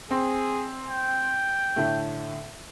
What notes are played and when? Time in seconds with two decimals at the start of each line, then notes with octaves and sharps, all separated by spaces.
0.11 C4 G#4
0.88 G5
1.76 A2 D3 A3